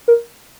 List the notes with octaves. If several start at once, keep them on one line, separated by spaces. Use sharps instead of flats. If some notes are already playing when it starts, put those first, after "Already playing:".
A#4